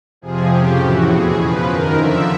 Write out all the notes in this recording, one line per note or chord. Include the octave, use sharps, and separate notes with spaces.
F2 C3 F3 G#4
F2 C#3 F3 G4
A2 E3 F#4
E2 B2 G#4
E2 C#3 F3 B4
F#2 D#3 A#4
F2 D3 F3 E5